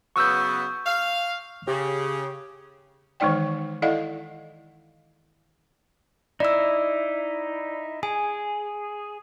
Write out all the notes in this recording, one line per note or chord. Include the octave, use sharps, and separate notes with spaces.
C#3 F#3 B3 C#6 E6 G6
F5
C#3 G4
D#3 E3 G#3 D#4 D5 G5
E4 A4 D5 D#5 F5 F#5
D#4 E4 D5 E6
G#4 G#5